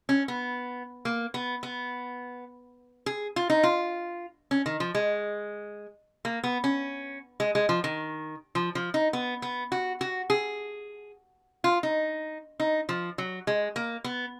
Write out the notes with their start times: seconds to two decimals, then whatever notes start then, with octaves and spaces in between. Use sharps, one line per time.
0.09 C#4
0.28 B3
1.05 A#3
1.34 B3
1.63 B3
3.06 G#4
3.36 F4
3.50 D#4
3.63 F4
4.51 C#4
4.66 D#3
4.80 F3
4.95 G#3
6.25 A#3
6.44 B3
6.64 C#4
7.40 G#3
7.55 G#3
7.69 F3
7.84 D#3
8.55 F3
8.75 F3
8.94 D#4
9.13 B3
9.42 B3
9.72 F#4
10.01 F#4
10.30 G#4
11.64 F4
11.83 D#4
12.60 D#4
12.89 F3
13.18 F#3
13.47 G#3
13.76 A#3
14.04 B3